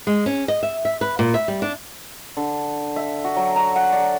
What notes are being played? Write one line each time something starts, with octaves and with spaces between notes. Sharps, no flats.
G#3
C#4
D#5
E5
E5
B4
A#2
E5
G3
D4
D3
E5
F#4
F#3
A#5
F#5
D5